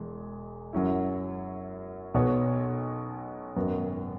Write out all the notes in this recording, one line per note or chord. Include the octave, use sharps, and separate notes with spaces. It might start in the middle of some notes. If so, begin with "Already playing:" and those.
Already playing: E1 E2 G#3
F#2 F#3 C#4 E4
B1 B2 B3 F#4 C#5
G#1 F#2 F#3 B3 F#4